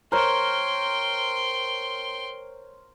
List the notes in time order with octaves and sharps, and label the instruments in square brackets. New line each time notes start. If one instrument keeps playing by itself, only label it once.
[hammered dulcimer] A#4 C5 C#5 [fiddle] G5 C6